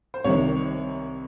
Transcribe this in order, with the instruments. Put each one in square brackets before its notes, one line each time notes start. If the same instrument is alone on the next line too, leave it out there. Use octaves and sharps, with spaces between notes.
[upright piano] C5
C2 C3 D#3 C#5